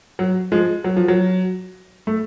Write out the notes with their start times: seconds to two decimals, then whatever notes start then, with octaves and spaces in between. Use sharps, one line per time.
0.19 F#3
0.52 F3 G#3
0.84 F#3
0.97 F3
1.08 F#3
2.07 A3